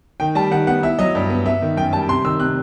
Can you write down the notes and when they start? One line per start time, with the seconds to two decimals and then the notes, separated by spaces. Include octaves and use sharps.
0.20 D#3 G5
0.35 G3 A5
0.51 D#3 F#5
0.67 B3 F#5
0.83 E4 E5
0.99 F#3 D#5
1.15 G2
1.30 B3
1.46 B3 E5
1.62 D#3
1.77 F#2 G5
1.93 G3 A5
2.08 C3 C6
2.24 D#3 E6
2.40 C3 F#6